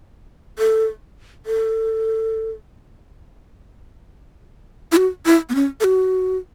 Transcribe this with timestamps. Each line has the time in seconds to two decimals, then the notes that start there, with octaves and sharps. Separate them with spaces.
0.59 A4
1.46 A4
4.92 E4
4.97 F#4
5.26 E4
5.49 B3
5.55 C#4
5.80 A4
5.85 F#4